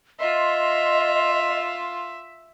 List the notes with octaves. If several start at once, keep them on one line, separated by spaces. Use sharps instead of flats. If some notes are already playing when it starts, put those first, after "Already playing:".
F4 D#5 E5 C6